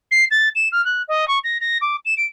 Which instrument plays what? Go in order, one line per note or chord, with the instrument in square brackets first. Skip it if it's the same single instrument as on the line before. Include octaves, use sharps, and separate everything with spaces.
[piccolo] C7
A6
E7
F6
F#6
D#5
C#6
A#6
A#6
D6
E7
D7